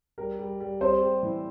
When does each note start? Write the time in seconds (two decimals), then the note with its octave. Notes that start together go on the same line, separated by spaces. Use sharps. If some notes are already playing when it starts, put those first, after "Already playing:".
0.18 G3 A#4
0.39 G3
0.60 G3
0.81 G3 C4 C5
1.02 G3
1.23 E3